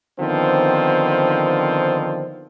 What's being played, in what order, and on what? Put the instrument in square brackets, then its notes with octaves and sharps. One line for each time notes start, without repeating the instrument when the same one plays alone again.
[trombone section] D3 D#3 F3 B3 C4